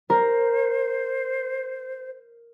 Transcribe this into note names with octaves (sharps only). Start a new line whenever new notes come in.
A#4 C5